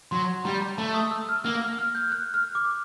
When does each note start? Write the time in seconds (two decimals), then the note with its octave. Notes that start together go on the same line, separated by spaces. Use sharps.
0.11 F#3 C6
0.45 G3 A#5
0.62 A#5
0.78 A3 A5
0.94 D#6
1.11 E6
1.29 F6
1.44 A#3 F6
1.62 F6
1.79 F6
1.95 G6
2.12 F#6
2.34 F6
2.55 D6